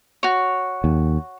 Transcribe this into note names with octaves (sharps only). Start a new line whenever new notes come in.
F#4 C#5
D#2